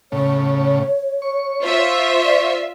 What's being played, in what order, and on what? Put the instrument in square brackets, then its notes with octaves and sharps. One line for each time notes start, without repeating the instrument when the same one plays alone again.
[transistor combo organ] A2 C#3 [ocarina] C#5
[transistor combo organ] C#6
[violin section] F4 E5 [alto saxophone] C5
[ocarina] D5